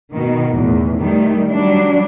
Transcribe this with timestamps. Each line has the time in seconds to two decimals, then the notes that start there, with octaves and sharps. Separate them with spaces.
0.13 B2 D#3
0.53 E2 A2
0.99 D#3 G3 A3
1.48 F#3 G3 D4